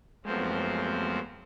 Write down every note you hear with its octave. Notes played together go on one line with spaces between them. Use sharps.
F#2 F3 G#3 A3 B3 C4